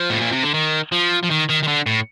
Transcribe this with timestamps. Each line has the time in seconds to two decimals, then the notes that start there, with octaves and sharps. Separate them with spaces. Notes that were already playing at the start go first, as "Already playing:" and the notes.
Already playing: F3
0.10 A2
0.21 A#2
0.32 C3
0.43 D3
0.54 D#3
0.92 F3
1.23 F3
1.30 D#3
1.49 D#3
1.63 D#3
1.67 D3
1.86 A2